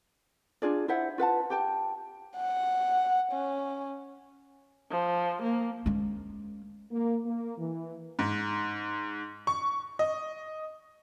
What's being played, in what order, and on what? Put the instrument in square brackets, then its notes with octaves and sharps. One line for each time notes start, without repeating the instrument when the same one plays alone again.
[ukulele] D4 F4 G#4 D5
E4 C5 E5 F#5
F4 B4 F#5 A5
G4 G5 A5
[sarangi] F#5
C#4
[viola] F3
A#3
[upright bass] G#3 C#4
[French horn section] A#3
A#3
E3
[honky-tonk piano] G#2
C#6
D#5